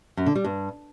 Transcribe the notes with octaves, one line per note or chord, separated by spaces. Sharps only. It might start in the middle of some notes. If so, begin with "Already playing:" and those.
F#2
D3
G3
G2